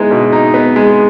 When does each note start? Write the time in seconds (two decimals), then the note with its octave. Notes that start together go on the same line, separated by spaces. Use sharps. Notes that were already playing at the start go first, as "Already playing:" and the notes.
Already playing: G#3 B3 D#4 E4
0.11 B2
0.33 D#4
0.54 B3
0.76 G#3